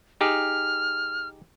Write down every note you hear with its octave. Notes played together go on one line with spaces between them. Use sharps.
D#4 G4 G#4 F6